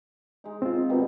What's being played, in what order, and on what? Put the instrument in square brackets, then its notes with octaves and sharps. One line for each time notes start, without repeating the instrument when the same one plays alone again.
[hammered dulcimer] G#3 D#4
[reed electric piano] C4 F4 [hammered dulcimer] C5
[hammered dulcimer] B2 D#3 G3